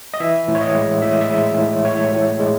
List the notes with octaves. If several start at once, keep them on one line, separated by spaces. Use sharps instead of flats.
D#5
E3 E5
A2
C#5
D#5
G#3
A2 E5
D#5
E5
G#3
A2
A2 C#5
A2
G#3